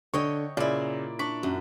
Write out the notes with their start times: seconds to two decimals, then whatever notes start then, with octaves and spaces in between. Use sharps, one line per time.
0.14 D3 C#5 D#5 G5 C#6
0.57 A#2 C#3 E4 D5
1.19 D4 C#6 B6
1.43 F#2